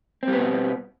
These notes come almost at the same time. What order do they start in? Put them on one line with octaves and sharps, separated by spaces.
C4 G3 B3 B2